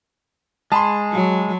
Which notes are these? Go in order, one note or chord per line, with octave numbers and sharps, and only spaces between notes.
G#3 G#4 A5 B5 C6
F#3